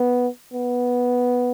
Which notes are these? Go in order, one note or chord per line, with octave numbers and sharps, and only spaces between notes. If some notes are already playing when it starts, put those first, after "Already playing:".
Already playing: B3
B3